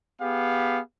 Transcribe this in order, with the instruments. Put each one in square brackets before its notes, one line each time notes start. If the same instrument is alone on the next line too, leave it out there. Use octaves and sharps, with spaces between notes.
[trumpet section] B3 G4 G#4 F5